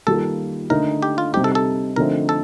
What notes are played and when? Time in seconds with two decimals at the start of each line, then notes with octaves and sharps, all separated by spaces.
0.07 D#3 G3 A#3 F4 A4
0.70 D3 A3 D#4 A#4
1.02 G4
1.18 F4
1.34 C3 G3 C4 D#4 G4
1.44 A4
1.55 A4
1.96 D3 F3 A3 C4 D#4 A#4
2.29 A4